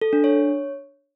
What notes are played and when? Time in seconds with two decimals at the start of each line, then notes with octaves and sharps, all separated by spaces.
0.01 A4
0.13 D4
0.24 C#5